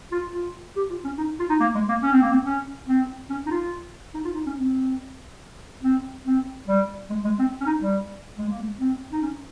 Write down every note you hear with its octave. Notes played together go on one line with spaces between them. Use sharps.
F4
F4
G4
F4
C#4
D#4
F4
D#4
A#3
G#3
A#3
C#4
C4
A#3
C4
C#4
C4
C#4
D#4
F4
D#4
F4
D#4
C#4
C4
C4
C4
G3
G#3
G#3
C4
C#4
D#4
G3
G#3
A#3
G#3
C4
D#4
C#4